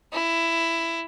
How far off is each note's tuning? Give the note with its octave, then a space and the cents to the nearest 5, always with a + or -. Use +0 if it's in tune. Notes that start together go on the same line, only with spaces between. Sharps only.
E4 +10